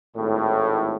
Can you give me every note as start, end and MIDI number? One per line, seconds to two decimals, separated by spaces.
0.15 0.97 32
0.15 0.97 45